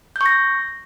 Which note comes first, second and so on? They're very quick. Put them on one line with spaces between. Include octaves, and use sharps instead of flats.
G6 C#6 A#6